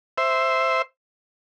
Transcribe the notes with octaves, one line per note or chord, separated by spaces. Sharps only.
C5 E5